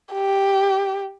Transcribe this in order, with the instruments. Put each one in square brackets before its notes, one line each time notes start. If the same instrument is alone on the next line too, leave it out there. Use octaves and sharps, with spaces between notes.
[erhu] G4